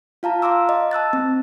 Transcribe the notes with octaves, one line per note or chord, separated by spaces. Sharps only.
F4 F5 A5 A#5
F5 A#5 C6 D6 E6
D#5
A5 E6 F#6 A6
C4